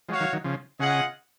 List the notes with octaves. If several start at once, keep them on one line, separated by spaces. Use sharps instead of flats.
F3 G#3 F#4 C#5 F5
D#3 F#3
D#3 F#3
C#3 F3
C#3 F4 G#4 D#5 F#5